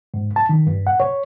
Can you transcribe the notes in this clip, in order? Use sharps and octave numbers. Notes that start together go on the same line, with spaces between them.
G#2
A5
D#3
G2
F#5
C#5